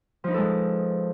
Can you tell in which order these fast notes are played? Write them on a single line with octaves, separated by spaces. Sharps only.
F3 D#4 B4 A4 G#3